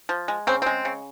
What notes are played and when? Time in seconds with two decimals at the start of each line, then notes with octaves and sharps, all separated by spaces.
0.09 F3
0.28 G#3
0.47 C#3 C4
0.62 G#3 C4
0.85 C#3